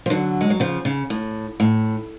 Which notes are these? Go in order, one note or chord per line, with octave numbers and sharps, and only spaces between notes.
F3
D3 F#3
G#3
F#3
C#3 F3
C#3
A2
A2